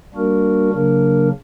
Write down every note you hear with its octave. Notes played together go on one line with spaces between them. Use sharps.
G3 A#3 D4 F#4 A#4
C#3 F#3 A#3 D4 A#4